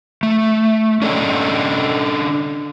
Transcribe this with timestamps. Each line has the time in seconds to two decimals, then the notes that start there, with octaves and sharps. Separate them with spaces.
0.23 A3
1.02 C#4 D4 A4 D#5